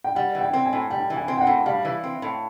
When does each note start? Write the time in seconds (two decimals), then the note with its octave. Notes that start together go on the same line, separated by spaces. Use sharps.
0.04 G5
0.15 G3 F#5
0.35 E3
0.41 G5
0.53 C4
0.66 G#5
0.73 A2
0.90 G3 G5
1.10 E3
1.16 G#5
1.28 C4
1.37 G5
1.41 F#5
1.47 A2
1.66 G3 F5
1.85 E3
2.03 C4
2.22 A2